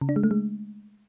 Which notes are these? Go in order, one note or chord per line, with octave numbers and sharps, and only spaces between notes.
C#3
D4
G#3
A3
G#3